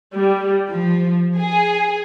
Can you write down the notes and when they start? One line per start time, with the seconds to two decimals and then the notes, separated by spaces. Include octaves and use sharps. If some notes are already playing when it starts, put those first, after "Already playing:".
0.14 G3
0.67 F3
1.38 G#4